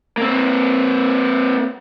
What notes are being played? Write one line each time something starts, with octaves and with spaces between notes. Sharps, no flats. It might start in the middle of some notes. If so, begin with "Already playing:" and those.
A#3 C4